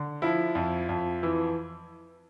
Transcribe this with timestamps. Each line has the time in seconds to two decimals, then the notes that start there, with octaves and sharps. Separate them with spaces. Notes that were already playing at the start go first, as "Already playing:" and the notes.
Already playing: D3
0.22 F3 E4
0.55 F2
0.89 F2
1.23 E3